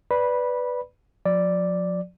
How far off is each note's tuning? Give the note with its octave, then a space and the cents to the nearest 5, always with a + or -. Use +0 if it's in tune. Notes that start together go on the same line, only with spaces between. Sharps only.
B4 +0 D5 +0 B5 -15
F3 +45 D5 +0